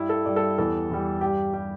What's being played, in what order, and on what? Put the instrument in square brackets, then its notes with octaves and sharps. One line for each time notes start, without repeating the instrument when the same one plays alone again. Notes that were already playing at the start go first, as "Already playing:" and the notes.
Already playing: [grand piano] G2 G3 E4
A4
G2 G3 D5
A4
E2 E3 G3 A4
E2 E3 G3
G2 G3 G4
G3 G4